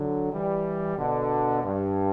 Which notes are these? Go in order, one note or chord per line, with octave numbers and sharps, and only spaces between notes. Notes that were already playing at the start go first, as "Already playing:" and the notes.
Already playing: D3 F#3
E3 G3
B2 D3
G2